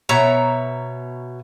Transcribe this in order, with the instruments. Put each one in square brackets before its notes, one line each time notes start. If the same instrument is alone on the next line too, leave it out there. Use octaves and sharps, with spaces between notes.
[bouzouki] B2 C#5 E5 A#5